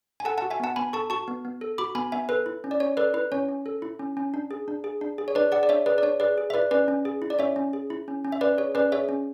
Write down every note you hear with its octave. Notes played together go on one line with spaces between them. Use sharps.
G#5
A4 F#5 A5
F#5 A5
F#4
E5 G#5
B3 F#5 A5
B3 G#5 B5
A4 A5 C#6
F#4 A5 C#6
B3
B3
A4
F#4 B5 D6
B3 G#5 B5
B3 E5 G#5
A4 B4
E4
C#4
D5
C#4 C#5
A4 B4 D5
E4 B4
C#4 C#5
C#4
A4
E4
C#4
C#4
D4
G#4
D4
G#4
D4
G#4
C#5
D4 B4 D5
G#4 D5 F#5
D5
D4 C#5 E5
G#4 B4 D5
D5
D4 C#5
G#4 B4 D5
G#4
E5
E4 B4 D5
C#4 B4 D5
C#4
G#4
E4
D5
C#4 C#5 E5
C#4
G#4
E4
C#4
C#4
E5
C#4 B4 D5
G#4 C#5
C#4 B4 D5
G#4 C#5 E5
C#4